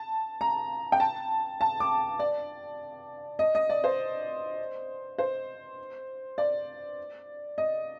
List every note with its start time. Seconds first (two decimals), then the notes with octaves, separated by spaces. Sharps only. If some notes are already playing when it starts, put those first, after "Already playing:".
Already playing: A5
0.41 A#5
0.92 G5
1.00 A5
1.61 A5
1.80 D6
2.19 D5
3.39 D#5
3.55 D#5
3.69 D5
3.84 C5
5.18 C5
6.38 D5
7.58 D#5